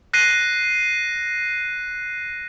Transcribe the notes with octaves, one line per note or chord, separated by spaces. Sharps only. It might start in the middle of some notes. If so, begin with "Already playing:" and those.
F#6 A#6 C7 D#7